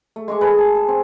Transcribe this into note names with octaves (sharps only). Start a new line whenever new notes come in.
A3
G#3 C#6 D6
G#4 A4 B4
A5
G#4
C4